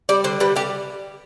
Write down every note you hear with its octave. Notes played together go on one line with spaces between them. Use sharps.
G3 D5
D3 C5
G3 B4
G3 G4